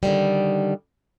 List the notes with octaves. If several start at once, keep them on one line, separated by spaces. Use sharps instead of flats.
D3 D#3 G3